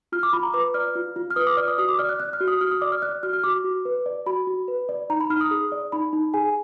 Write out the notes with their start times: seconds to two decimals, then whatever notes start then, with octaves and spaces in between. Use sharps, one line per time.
0.12 F4 F6
0.23 D6
0.33 F4 B5
0.43 A#5
0.54 B4 D6
0.74 D5 F6
0.95 F4
1.16 F4
1.31 F6
1.36 B4 D#6
1.47 D6
1.57 D5 F6
1.68 D#6
1.78 F#4 D#6
1.88 D6
1.99 D5 F6
2.09 F#6
2.20 D5 F#6
2.33 F6
2.40 F#4
2.48 D#6
2.61 F#4 F6
2.71 D#6
2.81 D5 D6
2.92 F6
3.02 D5 F#6
3.23 F#4 F6
3.33 F6
3.44 F#4 D6
3.64 F#4
3.85 B4
4.06 D5
4.26 F#4 B5
4.47 F#4
4.68 B4
4.89 D5
5.10 D#4 A#5
5.20 B5
5.30 D#4 F6
5.41 D#6
5.51 G#4
5.72 D5
5.92 D#4 B5
6.13 D#4
6.34 G#4 G#5